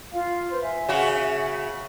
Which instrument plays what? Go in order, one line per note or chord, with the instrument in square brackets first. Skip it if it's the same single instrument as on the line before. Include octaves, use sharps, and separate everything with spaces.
[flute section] F4 F5
B4 C5 C6
E5 G#5
[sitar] C#3 F#4